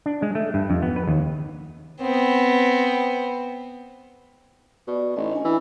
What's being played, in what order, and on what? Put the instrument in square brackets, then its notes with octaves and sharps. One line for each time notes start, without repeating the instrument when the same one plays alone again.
[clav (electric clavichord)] D4
G#3
A3
G2
F2
B3
B4
D#2
[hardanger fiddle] B3 C4
[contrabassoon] B2 [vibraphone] D5
[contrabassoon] A1 [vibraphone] D#4 D#5
[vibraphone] D4 G#5
[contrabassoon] E3 [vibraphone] E5